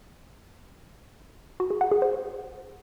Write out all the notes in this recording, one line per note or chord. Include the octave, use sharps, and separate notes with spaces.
F#4
G#4
F#5
G#4
C5